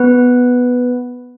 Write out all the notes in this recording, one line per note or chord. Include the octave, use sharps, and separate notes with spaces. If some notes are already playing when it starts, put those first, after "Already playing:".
Already playing: B3 B4